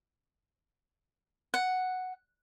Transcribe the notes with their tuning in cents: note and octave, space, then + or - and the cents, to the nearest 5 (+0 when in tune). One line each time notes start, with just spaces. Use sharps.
F#5 +0